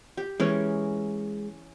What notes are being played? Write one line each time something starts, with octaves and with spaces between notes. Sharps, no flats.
G4
E3 G#3 C#4 A#4